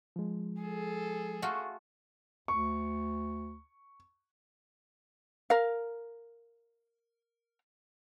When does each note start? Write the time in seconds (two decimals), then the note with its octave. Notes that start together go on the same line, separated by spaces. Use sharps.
0.16 F3 G#3
0.61 G#4 A4
1.42 A3 F4 F#4
2.48 D2 C#6
5.50 A#4 F5